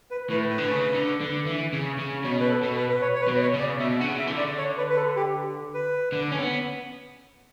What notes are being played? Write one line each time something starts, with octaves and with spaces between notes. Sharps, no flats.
B4
A2 B4
B4
D3
C#3
D3
D3
E3
C#3
C#3
B2 C#5
B4
A4
B2
B4
B4
C#5
C#5
B4
B2
C#5
C#3
D5
B2 E5
D3 F#5
C#3
E5
E3
D3
D5
C#5
B4
B4
A4
G4
B4
D3
C#4
B3